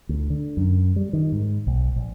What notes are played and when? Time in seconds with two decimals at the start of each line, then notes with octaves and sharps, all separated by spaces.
0.09 D2
0.30 D3
0.57 F#2
0.96 G3
1.13 D#3
1.32 G#2
1.67 B1
1.96 A#1